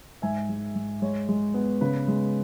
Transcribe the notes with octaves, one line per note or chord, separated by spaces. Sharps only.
G#2 E5 G#5
G#3
G#2
G#3 C#5
G#3
B3
C#3 B4
G#3